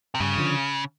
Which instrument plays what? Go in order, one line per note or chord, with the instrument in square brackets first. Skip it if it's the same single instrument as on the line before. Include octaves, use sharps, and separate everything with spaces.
[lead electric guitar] C3
[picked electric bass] G2 [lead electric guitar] C#3
[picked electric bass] D3 F3